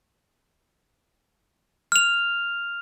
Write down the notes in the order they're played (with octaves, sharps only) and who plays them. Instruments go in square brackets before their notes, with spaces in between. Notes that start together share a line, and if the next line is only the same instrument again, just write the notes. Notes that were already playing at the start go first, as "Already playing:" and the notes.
[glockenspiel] F6 F7